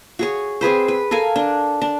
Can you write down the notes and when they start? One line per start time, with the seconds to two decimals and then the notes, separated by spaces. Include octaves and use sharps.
0.19 F#4 G#4 C#5
0.61 C4 G#4 B4 C5
0.88 B4
1.11 A4 A#4 F5 G#5
1.36 D4
1.82 D4